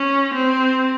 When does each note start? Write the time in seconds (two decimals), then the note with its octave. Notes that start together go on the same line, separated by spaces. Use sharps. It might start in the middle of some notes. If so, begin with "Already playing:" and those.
Already playing: C#4
0.34 C4